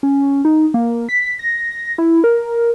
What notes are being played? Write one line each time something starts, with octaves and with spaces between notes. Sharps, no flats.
C#4
D#4
A#3
B6
A#6
E4
A#4